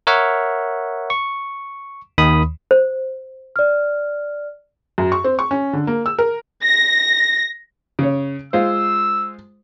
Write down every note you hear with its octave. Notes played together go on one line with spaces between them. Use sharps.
A#4 C#5 E5 F#5
C#6
D#2 D#3 B5 D#6
C5
D5 F6
F#2
C#6
C4
C#6
C#4
D3
A#3
E6
A#4
A#6
C#3 C#5
G#3 F4 C5 E6